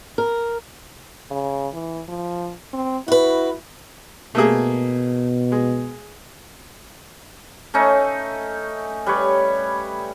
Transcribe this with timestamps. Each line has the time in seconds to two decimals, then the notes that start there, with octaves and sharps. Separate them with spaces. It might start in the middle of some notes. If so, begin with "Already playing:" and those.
0.18 A#4
1.31 C#3
1.73 E3
2.09 F3
2.74 C4
3.08 E4 F#4 B4
4.35 B2 A3 A#3 G#4
5.52 G#3
7.74 A3 C#4 D#4
9.06 G3 B4 C#5